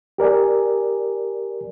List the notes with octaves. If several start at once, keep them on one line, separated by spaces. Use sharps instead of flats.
G4 A#4 D5 G#5